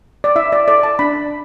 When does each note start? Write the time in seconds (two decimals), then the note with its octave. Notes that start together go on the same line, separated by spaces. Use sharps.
0.24 D5
0.36 E4 E5
0.52 D5
0.68 A4 D5
0.83 A5
0.99 D4 B5